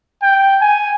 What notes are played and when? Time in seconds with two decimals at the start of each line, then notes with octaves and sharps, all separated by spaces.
0.22 G5
0.61 G#5